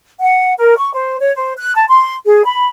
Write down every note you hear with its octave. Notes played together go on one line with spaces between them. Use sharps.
F#5
A#4
C#6
C5
C#5
C5
F#6
A5
C6
G#4
B5